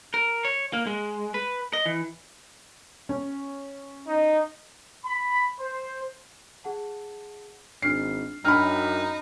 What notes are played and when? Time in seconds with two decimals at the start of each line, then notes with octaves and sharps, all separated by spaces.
0.14 A#4
0.45 C#5
0.73 A#3
0.87 G#3
1.34 B4
1.73 D#5
1.86 E3
3.09 C#4
4.07 D#4
5.05 B5
5.58 C5
6.64 G#4 F#5 A5
7.82 G#1 D4 F6 C7 C#7
8.45 F#2 D4 D#4 G5 B5 E6 F6